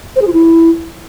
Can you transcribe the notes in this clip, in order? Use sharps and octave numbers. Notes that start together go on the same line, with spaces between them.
C5
G#4
F4
E4